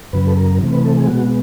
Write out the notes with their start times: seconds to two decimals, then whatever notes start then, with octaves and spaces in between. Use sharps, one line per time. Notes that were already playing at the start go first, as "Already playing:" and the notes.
0.13 F#2 C#3 F#3 B4
0.27 A4
0.37 A#4
0.61 C3 E3 A3 C4
0.72 B4
0.84 A4
0.97 G#4
1.07 B2 G#3 B3 F#4